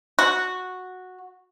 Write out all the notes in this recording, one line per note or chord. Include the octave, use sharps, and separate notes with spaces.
F#4